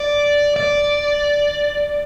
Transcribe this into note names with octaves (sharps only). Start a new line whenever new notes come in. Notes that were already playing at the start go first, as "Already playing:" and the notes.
Already playing: D5
D5